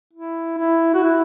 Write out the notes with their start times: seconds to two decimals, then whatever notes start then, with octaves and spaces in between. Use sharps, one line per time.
0.13 E4
0.58 E4
0.94 F#4
1.04 E4